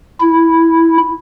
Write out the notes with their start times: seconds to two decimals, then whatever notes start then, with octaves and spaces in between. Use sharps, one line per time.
0.21 E4